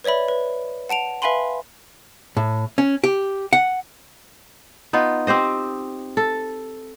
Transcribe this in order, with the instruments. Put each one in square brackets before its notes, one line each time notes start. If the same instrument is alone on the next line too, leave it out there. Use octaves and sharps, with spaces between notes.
[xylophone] B4 C#5 D5 E5 B5
B4
F#5 A5 D7 F7
B4 E5 F5 G#5 B5 C6
[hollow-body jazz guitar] A2
C#4
G4
F#5
[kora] B3 D#4 F4
C4 G4 C5 D#5
A4